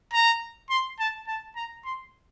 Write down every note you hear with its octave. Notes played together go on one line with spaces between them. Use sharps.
A#5
C6
A5
A5
A#5
C6